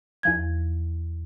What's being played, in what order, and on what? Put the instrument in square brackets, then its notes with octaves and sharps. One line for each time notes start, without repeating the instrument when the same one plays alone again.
[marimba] E2 F3 G#6